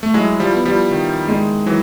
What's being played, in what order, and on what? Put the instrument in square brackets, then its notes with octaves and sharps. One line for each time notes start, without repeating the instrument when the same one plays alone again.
[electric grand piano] A3
[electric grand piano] F#3 G#3 [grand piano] E4
[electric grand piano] F3 G3
[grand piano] B3
[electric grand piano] F3 G3
[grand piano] D#3
G#3
[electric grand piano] E3 F#3